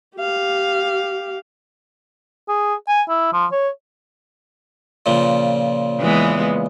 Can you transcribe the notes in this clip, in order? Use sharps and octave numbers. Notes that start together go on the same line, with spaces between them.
G4 F5
G#4
G#5
E4
F3
C#5
A#2 C#3 F3
E3 G#3 B3